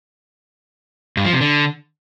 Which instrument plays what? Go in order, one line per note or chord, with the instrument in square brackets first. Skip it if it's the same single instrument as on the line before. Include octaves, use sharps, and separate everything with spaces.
[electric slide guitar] G2
F3
C3
D3